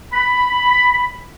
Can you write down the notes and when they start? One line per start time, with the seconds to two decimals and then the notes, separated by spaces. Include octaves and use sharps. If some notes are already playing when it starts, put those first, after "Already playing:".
0.13 B5